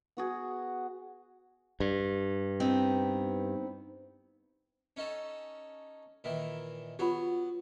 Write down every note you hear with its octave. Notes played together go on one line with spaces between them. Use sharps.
B3 F#4 G#4
G2
B3 C4 D#4
C#4 D#4 A4
A#2 D#3 E3
F#3 B3 F4 G4